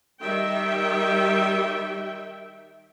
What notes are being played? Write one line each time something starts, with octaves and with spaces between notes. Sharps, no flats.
D#3 G3 E5 G5